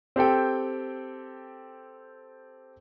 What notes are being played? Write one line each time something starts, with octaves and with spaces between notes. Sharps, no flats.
C4 G4 A4 G5